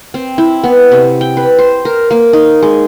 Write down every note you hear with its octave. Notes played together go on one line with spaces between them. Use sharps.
C4
E4
B3
C3
G5
B4
C5
A#4
A#3
D#4
G#3